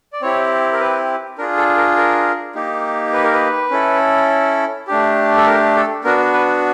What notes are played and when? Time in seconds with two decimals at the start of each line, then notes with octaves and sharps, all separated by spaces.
0.13 D5
0.22 C4 E4 G4 C#5
0.73 A#4
0.80 B4
1.38 D4 F4 G#4 A#4
1.57 A4
1.77 A#4
1.97 A#4
2.55 A#3 D#4 G4
3.13 B4
3.24 A#4
3.33 B4
3.71 C#4 E4 A4
4.87 A3 D4 G4
5.37 A4
5.47 A#4
5.76 A4
6.04 B3 D4 F#4 A#4
6.34 B4